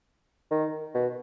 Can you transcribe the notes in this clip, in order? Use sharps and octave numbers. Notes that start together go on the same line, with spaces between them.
D#3
B2